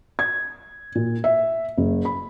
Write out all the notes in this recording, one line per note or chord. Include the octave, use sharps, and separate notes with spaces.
G#6
A#2
E5
F#1
B5